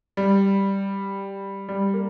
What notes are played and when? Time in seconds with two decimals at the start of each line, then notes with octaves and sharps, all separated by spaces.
0.17 G3
1.69 G3
1.94 A#3